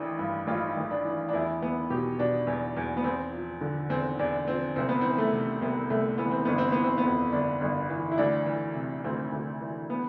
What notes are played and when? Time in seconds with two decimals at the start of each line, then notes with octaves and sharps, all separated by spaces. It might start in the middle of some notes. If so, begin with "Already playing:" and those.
Already playing: A1 E3 D4
0.19 G2
0.47 A1 F4
0.77 A1
0.91 D4
1.05 E3
1.29 D4
1.33 E2 E4
1.62 E2 B3
1.90 B2 G4
2.19 B2 D4
2.47 E2
2.77 E2
2.97 B3
3.04 E2 C4
3.32 F3
3.61 D3
3.90 E2 C4
4.19 E2 D4
4.47 F3 C4
4.76 C2 C4
4.89 B3
5.01 E3 C4
5.18 A3
5.32 C3
5.61 C2 B3
5.90 C2 A3
6.18 E3 B3
6.31 C4
6.45 G1 B3
6.58 C4
6.72 E3 B3
6.84 C4
6.98 B3
7.04 F2
7.32 G1 D4
7.61 G1
7.90 E3
8.12 E4
8.18 D2 D4
8.46 E3
8.75 C3
9.04 D2 C4
9.32 D2
9.61 E3
9.90 B3